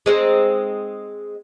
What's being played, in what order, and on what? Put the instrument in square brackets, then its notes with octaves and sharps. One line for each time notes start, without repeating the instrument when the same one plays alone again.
[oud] G#3 C4 D#4